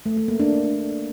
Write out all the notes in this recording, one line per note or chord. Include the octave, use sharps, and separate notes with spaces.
A3
A3
A#3
D4